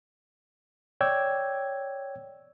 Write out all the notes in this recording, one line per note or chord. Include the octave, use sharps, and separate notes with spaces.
C#5 D5 G5 E6 G#6